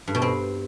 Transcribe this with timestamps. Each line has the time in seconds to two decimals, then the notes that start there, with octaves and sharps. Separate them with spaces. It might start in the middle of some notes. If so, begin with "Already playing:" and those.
0.08 G2
0.15 B2
0.22 C4